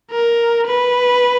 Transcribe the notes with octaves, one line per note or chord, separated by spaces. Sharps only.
A#4
B4